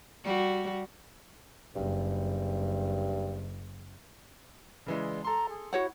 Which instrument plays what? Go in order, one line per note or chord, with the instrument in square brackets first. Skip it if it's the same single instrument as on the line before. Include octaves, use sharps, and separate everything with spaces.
[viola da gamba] G3 F#4
[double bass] F#1 [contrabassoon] G2
[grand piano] C#3 E3 G#3 [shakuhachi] D5
[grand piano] A4 C6 [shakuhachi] A#5
[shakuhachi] G#4
[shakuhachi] E4 [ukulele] F#4 C#5 F#5